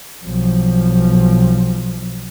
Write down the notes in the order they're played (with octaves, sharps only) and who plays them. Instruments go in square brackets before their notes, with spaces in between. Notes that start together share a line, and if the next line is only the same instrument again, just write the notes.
[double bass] B1 F3